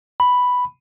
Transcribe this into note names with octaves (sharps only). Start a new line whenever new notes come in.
B5